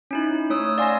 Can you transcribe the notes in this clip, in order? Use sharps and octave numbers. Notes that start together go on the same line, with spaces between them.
C#4 D#4 E4
A3 C#5 D#6 E6
D5 F5 G#5 C6 E6 A#6